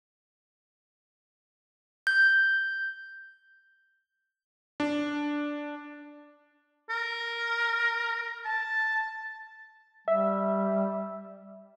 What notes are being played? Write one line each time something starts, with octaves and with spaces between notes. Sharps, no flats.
G6
D4
A#4
A5
G3 E5